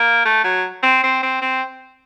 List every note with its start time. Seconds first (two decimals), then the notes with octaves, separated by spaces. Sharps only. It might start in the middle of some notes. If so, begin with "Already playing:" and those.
Already playing: A#3
0.25 A3
0.44 F#3
0.83 C4
1.03 C4
1.23 C4
1.41 C4